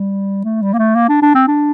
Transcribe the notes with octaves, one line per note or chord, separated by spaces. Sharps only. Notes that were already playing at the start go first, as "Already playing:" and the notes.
Already playing: G3
A3
G3
A#3
A3
A#3
D4
D4
C4
D4